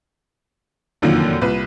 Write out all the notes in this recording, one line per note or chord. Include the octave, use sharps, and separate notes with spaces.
F1 F#2 D3 D#3 F3 A#3
C2 A#2 B4